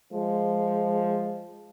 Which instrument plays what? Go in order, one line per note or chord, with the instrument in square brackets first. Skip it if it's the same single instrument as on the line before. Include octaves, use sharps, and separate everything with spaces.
[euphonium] F3 [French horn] G#3